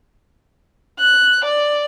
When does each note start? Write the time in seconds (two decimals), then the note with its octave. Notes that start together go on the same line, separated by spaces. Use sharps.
1.00 F#6
1.44 D5